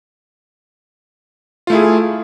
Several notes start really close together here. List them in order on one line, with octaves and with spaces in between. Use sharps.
F4 A3 E4 G#4